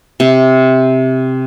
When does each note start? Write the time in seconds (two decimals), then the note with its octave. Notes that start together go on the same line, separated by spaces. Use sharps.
0.20 C3